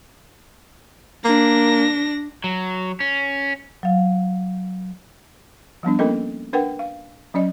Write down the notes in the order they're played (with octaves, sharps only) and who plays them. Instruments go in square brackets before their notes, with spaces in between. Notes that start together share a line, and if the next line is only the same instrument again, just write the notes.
[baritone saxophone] A#3 [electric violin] D4 A#6
[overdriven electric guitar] F#3
C#4
[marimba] F#3 F5
[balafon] F3 G3 B3 D4
A#3 C#4 E4 A4 A#4 D#5
D4 A#4 B4 F#5 G5
F5
F#3 C#4 D5 D#5